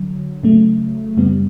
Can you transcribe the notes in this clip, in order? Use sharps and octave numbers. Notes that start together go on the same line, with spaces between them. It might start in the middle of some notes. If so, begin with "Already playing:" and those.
Already playing: D3 F#3
C#3 F#3 A3
F#2 C#3 G3 B3